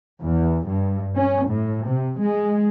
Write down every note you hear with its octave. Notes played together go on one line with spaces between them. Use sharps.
E2
G2
C#4
A2
C3
G#3